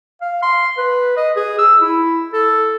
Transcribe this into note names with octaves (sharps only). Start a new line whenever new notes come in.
F5
C6
B4
D#5
G#4
E6
E4
A4